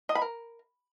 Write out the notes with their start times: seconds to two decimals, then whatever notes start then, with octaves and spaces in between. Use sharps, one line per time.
0.09 D#5
0.15 B5
0.22 A#4